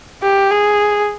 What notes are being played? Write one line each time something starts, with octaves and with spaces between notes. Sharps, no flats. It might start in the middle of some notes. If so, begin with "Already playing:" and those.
G4
G#4